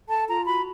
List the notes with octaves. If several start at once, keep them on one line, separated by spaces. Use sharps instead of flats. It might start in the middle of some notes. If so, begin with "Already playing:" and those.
A4 A5
F4 A#5
F#4 B5